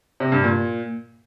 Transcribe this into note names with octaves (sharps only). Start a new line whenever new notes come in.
C3
G2
A#2